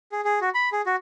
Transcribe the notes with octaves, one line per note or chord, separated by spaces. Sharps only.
G#4
G#4
F#4
B5
G#4
F#4